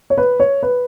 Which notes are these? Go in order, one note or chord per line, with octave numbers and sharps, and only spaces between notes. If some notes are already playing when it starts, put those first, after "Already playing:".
C#5
B4
C#5
B4